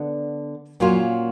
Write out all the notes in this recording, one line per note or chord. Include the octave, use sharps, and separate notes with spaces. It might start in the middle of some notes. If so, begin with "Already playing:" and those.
Already playing: D3 B3 D4
A#2 F#3 A#3 C#4 F4